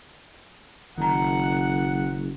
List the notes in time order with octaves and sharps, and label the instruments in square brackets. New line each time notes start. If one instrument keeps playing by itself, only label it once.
[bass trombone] F#1 [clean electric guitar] D#3 A#5 [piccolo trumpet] F#5